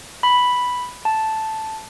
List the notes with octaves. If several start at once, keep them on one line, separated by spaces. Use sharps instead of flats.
B5
A5